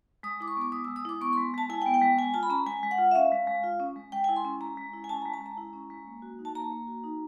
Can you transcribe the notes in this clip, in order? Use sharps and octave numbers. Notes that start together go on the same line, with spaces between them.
G#3 D#6
E4 D6
C#6
B3 D6
G#3 D#6
E6
G#3
D#6
E4 D6
B3 C#6
C6
G#3
G#3 A5
E4 G#5
G5
B3
G5
G#3
G#3 G#5
F4 A5
B5
C#4 A#5
G#3 G#5
G#3
F#5
F4
E5
C#4 F5
G#3
G#3
F4
C#4
G#3
G#3 G5
G#5
E4
C6
C#4
G#3 A#5
G#3
E4
G#5
C#4 A5
A#5
G#3
A5
G#3 A#5
E4
C#4
G#3
A#3
F#4
D#4
A5
A#3 A#5
A#3
F#4
D#4